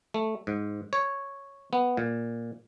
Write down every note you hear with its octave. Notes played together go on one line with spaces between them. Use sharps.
A3
G#2
C#5
B3
A#2